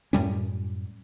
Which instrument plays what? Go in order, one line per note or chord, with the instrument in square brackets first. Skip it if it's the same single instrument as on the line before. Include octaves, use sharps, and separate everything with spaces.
[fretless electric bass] F#2 A2 G3 C#4